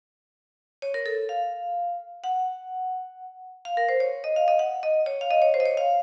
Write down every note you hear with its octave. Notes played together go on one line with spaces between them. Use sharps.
C#5
A#4
A4
F5
F#5
F5
A#4
C5
C#5
D#5
F5
D#5
F#5
D#5
C#5
F5
D#5
C#5
C5
D#5
C#5
F5